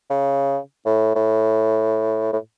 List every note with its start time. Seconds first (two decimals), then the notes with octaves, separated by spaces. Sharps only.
0.10 C#3
0.86 A2
1.15 A2
2.33 A2